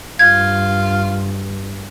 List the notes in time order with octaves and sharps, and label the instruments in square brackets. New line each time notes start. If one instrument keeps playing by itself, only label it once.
[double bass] G2 [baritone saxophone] F4 [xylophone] G#6